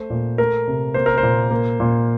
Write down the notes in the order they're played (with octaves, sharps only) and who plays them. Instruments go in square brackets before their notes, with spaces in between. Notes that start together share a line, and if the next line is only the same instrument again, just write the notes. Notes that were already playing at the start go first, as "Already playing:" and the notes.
Already playing: [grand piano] A3 C5
A#2
A3 A#4
C3
A#3 C5
A#4
C5
A#2
A#3
A#2